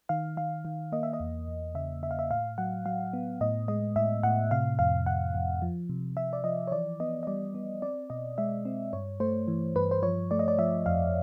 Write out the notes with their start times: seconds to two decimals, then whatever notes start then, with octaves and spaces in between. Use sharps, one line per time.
0.09 D#3 F5
0.37 D#3 F5
0.65 D#3
0.92 A#3 D#5
1.03 E5
1.13 D#5
1.20 E2
1.48 E2
1.75 C#3 E5
2.03 C#3 E5
2.11 F5
2.19 E5
2.31 A2 F5
2.58 F#3 F#5
2.86 F#3 F5
3.13 B3
3.41 A2 D#5
3.68 G#3 D#5
3.96 A2 E5
4.23 A2 F#5
4.51 C3 F5
4.79 F2 F5
5.06 F2 F#5
5.34 F2
5.62 F3
5.89 C3
6.17 C3 E5
6.33 D5
6.44 F3 D#5
6.67 C#5
6.72 E3 D5
7.00 B3 D#5
7.23 D#5
7.27 G3 D5
7.55 B3
7.82 C4 D5
8.10 B2 D#5
8.38 G#3 E5
8.65 C4
8.93 G2 C#5
9.20 A3 C5
9.48 E3
9.76 G2 B4
9.91 C5
10.03 F3 C#5
10.31 A3 D5
10.39 D#5
10.48 D5
10.59 F3 E5
10.86 F2 F5